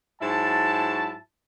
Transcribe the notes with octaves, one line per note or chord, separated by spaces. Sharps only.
G#2 F#3 E4 A5